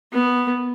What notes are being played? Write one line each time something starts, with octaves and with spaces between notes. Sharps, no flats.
B3